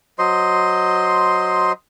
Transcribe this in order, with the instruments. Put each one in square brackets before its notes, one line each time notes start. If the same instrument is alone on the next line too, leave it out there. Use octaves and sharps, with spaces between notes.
[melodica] F#3 C5 D#5 C6